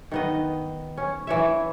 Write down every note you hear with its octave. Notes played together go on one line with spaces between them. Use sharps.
D#3 B3 D#5
C#4
E3 C#5 E5